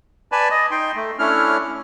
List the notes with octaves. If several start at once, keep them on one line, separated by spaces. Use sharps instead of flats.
B4 D5 G#5 A5 B5
D#5
D#4 G5 C6
A3
A3 C#4 D4 E4 C#5 F6